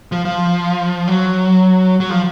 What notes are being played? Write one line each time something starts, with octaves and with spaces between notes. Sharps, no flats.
F3
F3
F#3
F#3
F3